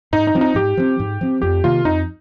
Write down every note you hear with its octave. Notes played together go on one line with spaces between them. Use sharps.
G#2 D#4
D#4
F3 C4
D#4
G#2 G4
F3 C4
G#2
F3 C4
F2 G4
C3 D#3 A#3 F4
F2 D#4